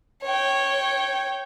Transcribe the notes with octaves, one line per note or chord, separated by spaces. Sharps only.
C#5 G5